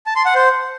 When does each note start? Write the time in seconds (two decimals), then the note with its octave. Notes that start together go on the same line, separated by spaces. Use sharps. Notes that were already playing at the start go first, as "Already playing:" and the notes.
0.06 A5
0.16 C6
0.25 F#5
0.35 C5